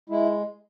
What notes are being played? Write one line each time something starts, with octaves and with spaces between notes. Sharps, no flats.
G#3 E4